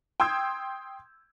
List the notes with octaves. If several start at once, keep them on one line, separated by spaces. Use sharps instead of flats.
G5 C6 D#6 E6 G6 G#6